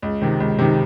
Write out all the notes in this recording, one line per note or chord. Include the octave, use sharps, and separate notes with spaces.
C#2
C3 D#3
C#2
C3 D#3